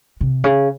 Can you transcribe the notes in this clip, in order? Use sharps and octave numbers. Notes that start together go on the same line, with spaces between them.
C3
C#3